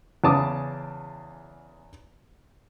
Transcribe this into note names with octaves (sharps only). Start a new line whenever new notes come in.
E2 C#3 A5 D6 D#6